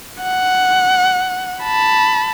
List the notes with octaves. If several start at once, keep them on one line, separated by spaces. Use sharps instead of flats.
F#5
A5 B5